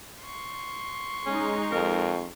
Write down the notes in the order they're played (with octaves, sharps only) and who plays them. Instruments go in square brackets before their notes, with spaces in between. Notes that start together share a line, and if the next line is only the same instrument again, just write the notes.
[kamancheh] C6 C#6
[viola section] G#3 D#4 [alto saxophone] C#4
[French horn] F2 [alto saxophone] A#4